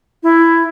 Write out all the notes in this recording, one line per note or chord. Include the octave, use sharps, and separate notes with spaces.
E4